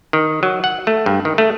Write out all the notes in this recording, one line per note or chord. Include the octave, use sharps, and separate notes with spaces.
D#3
F#3
F#5
A3
G2
D#3
A3